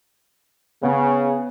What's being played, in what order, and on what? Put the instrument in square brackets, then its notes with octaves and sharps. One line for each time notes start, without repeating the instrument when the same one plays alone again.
[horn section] C#3 [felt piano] B3